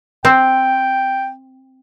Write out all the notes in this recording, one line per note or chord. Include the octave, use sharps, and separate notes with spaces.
C4 G5